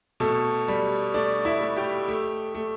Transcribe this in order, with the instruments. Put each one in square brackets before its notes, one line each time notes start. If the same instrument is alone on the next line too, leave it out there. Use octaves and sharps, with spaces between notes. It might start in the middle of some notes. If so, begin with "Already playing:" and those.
[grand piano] B2 A3 A4
G3
A3 D4 D5
E4 E5
A3
G4 G5
A3
A3